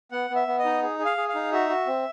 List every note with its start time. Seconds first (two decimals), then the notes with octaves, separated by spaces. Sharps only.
0.12 B3 F#5
0.30 B3
0.36 E5
0.48 B3
0.59 D#5
0.64 D#4
0.83 G#4
0.99 G#4
1.05 F5
1.17 G#4
1.29 F5
1.35 D#4
1.52 F#4 E5
1.69 F#4
1.87 C4